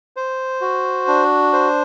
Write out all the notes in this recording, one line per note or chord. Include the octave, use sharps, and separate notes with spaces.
C5
F#4
D4
C5